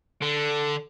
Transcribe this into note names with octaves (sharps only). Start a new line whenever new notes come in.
D3 A4